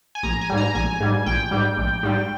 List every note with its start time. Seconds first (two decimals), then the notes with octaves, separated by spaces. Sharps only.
0.15 G#5
0.23 A#1 A#5
0.41 G#5
0.50 G#2 G3
0.58 A#5
0.75 A#1 G#5
1.00 G#2 G3
1.26 A#1 G5
1.51 G#2 G3
1.77 A#1
2.03 G#2 G3